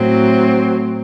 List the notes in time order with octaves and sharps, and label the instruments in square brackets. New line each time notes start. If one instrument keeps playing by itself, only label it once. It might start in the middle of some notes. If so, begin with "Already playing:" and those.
Already playing: [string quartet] A2 F#3 C4